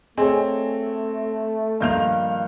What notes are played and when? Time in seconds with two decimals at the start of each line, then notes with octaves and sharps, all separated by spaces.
0.18 A3 C4 G#4 C#5 D#5 G#5
1.80 G2 D#3 F3 A#3 G6 F7